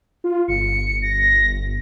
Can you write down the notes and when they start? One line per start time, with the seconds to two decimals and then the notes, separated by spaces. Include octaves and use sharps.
0.24 F4
0.48 G1 C#7
1.02 A#6